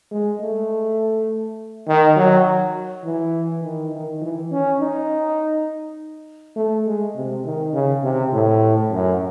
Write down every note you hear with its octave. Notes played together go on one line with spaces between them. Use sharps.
G#3
A3
D#3
F#3
E3
D#3
D#3
E3
C#4
D#4
A3
G#3
C3
D#3
C#3
C3
A2
F#2